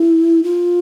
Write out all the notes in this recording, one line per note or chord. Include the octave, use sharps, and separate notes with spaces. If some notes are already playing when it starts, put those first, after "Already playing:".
Already playing: E4
F4